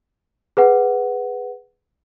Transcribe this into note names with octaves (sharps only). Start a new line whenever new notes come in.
G#4 B4 F#5